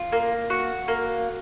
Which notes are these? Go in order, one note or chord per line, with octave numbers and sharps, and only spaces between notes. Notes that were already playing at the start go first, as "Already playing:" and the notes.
Already playing: F4
A#3
F#4
A#3